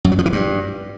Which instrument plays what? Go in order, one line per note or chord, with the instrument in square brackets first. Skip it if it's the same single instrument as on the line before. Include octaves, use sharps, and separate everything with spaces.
[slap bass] F#2
F#3
F3
E3
G2